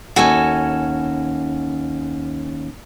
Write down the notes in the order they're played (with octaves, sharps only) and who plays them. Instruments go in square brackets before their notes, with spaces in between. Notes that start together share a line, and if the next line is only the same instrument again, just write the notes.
[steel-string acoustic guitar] D#2 C#4 [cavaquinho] F#4 A4 G#5